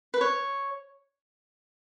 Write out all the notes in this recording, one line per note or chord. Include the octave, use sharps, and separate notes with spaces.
B4
C#5